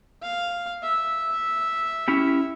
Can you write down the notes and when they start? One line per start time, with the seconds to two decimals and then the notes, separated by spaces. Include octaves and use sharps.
0.22 F5
0.83 E5
2.08 C#4 E4 G4